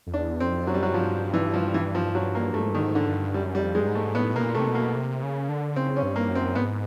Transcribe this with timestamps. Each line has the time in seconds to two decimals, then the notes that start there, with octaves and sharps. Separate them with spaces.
0.07 F2
0.13 E2 D4
0.40 F2 C4
0.67 F#2 F#3
0.74 G3
0.82 F#3
0.93 G2 F3
1.34 E3
1.54 F3
1.74 E3
1.95 F3
2.15 F#3
2.35 A#3
2.54 G2 A3
2.63 G#2
2.71 G2 D#3
2.82 G#2
2.95 D3
3.08 G2
3.34 F#2 G3
3.55 G3
3.61 F2
3.75 G#3
3.80 G2
3.88 G#2
3.95 A3
4.15 A2 B3
4.35 B2 A#3
4.42 A#2
4.55 C3 A3
4.68 B2
4.75 A#3
4.96 C3
5.23 C#3
5.49 D3
5.76 C#3 C4
5.96 C#4
6.03 G2
6.16 A#3
6.29 F#2
6.35 C4
6.55 G#2 B3